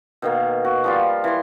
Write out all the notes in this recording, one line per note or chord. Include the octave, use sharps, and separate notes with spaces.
B2 D#3 A#3
F#4
F3 G3 F4
E3 C6